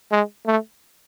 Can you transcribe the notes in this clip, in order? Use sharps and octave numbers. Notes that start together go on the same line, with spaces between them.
G#3
A3